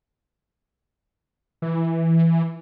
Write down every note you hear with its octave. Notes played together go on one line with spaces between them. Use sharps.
E3